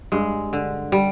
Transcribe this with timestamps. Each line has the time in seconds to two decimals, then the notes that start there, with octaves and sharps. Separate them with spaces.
0.12 G2 G#3
0.53 D3
0.92 G3